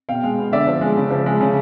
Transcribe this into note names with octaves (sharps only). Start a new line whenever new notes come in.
B2 F5 G5
G#3
B3
D3 D5 E5
F3
G#3
C#3
F3
G#3
C#3